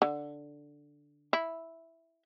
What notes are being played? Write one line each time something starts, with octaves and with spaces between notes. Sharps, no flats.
D3
E4